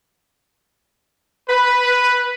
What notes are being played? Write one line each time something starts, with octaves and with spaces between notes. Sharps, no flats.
B4